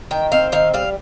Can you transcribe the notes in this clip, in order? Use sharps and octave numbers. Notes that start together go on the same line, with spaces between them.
D#3 G5
C4 F5
D#3 F5
G3 F5